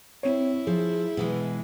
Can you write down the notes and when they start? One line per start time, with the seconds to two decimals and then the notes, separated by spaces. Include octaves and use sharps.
0.23 C4 E4 C#5
0.67 F3 G#4
1.17 B2 E3 G#3